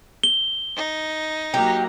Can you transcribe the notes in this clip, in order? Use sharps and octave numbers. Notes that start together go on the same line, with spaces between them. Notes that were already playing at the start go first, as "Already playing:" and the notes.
G7
D#4
F#3 A#3 G4 A#5